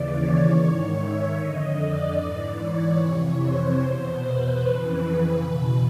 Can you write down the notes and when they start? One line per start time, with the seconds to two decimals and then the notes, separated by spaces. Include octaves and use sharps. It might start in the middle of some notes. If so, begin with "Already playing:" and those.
Already playing: D#2 C#3 E3 D5
0.13 C#5
0.55 G#2 D#3 C#5
0.95 E5
1.36 F2 D3 D#5
1.77 D5
2.17 G#2 E3
2.58 C#5
2.99 F2 C3 E3
3.39 C5
3.79 E2 B2
4.20 B4
4.61 F2 C#3 E3 B4
5.42 E2 B2 B4